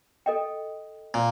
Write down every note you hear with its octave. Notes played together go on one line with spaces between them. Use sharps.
A4 D#5 G5
A#2